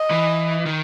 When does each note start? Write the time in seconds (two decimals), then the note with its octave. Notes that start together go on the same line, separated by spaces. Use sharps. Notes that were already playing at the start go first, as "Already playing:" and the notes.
Already playing: D#5
0.11 E3
0.66 D#3